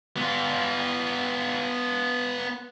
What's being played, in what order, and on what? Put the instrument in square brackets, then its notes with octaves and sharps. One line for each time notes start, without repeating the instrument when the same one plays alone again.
[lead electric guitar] B3 F4